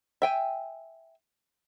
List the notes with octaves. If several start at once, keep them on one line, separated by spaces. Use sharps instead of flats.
E5 G5 G#5